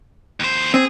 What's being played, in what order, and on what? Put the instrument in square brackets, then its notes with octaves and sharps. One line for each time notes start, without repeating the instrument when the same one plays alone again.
[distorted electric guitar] D#2 C5
[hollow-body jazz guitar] C4 [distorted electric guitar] G#4